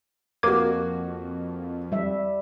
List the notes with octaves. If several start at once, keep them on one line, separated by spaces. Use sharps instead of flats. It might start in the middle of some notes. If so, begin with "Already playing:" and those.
F2 A#3 F#4 A#4 D6 G#6
G3 E5